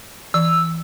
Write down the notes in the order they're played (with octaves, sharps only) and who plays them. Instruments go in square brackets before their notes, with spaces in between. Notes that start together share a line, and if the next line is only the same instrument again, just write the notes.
[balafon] E3 [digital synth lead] E6